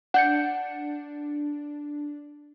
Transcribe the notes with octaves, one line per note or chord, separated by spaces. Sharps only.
D4 F#5 G6 C#7